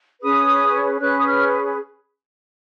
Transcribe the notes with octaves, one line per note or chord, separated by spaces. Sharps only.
C#4 G#4 B4 D#6
C#4 G#4 B4 F#6
D#6
F6